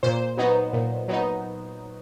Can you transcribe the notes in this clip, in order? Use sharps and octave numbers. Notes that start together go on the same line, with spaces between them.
A#2 C5
F#3 B3 D#4
A#2
F#3 B3 D#4